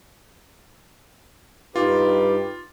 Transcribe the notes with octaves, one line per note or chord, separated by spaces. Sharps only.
G2 D#4 F4 G4 B4